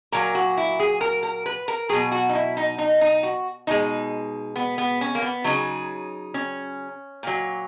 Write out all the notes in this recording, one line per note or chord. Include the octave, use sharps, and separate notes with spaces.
A#2 F#3 A#4
F#4
E4
G#4
A#4
A#4
B4
A#4
B2 F#3 G#4
F#4
D#4
E4
D#4
D#4
D#4
F#4
B2 G#3 D#4
B3
B3
C#4
A#3
B3
C#3 F#3 D#4
C#4
A#2 F#3